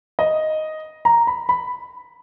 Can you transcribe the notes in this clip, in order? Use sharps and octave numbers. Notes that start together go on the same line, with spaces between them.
D#5
A#5
B5
B5